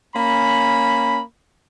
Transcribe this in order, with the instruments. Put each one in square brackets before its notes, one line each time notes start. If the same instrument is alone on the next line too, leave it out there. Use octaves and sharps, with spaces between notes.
[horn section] A#3 C#4 B5